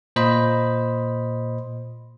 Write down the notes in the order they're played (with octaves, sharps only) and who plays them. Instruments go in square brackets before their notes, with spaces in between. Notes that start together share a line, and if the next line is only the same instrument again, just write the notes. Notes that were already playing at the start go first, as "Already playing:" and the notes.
[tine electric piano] A#2 C5 D#5 B5